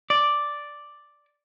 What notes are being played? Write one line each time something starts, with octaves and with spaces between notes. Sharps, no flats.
D5